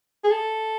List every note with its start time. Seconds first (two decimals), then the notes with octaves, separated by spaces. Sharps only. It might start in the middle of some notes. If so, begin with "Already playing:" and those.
0.24 G#4
0.30 A4